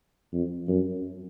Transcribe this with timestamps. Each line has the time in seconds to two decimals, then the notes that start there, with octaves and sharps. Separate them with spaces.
0.33 F2
0.68 F#2